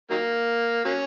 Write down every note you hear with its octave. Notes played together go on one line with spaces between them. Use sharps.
D#3 F#3 A#3
F#3 A#3 C#4